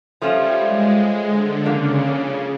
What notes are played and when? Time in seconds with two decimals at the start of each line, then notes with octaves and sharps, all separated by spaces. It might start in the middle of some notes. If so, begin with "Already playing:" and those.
0.22 F3 G3 A3 C#4 F4
0.58 G#3
0.94 G#3
1.29 D3
1.65 C#3 F3 A#3 D4 F4